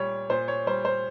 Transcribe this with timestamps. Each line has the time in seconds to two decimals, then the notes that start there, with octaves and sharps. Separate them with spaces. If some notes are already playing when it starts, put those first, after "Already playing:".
Already playing: A#2 G3 C#5
0.30 A#2 C5
0.48 C#5
0.67 G3 C5
0.85 C5